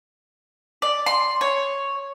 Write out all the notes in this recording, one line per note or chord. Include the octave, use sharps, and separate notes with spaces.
D5
C6
C#5